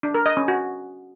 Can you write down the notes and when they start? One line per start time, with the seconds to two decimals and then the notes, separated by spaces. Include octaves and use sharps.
0.03 D4
0.15 A#4
0.26 D#5
0.37 C#4
0.48 F#4